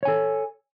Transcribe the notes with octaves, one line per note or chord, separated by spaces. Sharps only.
A4 C#5 G#5